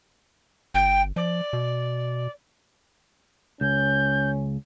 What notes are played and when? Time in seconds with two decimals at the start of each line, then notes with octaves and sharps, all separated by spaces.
0.74 G1 G5
1.16 F3 D5
1.53 B2
3.61 C#2 C#4 G6